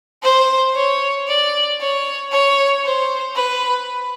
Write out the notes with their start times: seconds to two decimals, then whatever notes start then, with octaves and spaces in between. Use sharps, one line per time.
0.23 C5
0.75 C#5
1.28 D5
1.80 C#5
2.32 C#5
2.85 C5
3.36 B4